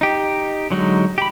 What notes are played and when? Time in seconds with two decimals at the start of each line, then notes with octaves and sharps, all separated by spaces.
0.01 D#4 G4
0.70 D3 F#3 G#3 D#4
1.18 G4 B5